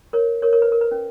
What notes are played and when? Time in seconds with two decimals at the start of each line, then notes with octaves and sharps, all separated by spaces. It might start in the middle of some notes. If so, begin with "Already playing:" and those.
0.13 A#4 C#5
0.42 A#4 C#5
0.53 A#4 C#5
0.62 B4
0.72 A#4
0.81 B4
0.91 C#4